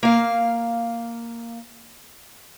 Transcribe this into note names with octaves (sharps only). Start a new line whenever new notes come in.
A#3 F5